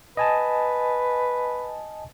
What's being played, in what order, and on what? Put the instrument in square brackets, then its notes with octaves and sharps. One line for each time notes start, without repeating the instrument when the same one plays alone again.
[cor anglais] B4 [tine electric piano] D#5 G#5 A5